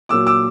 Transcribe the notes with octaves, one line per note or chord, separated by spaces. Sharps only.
A#2 F#3 A#3 D6 E6
D6 E6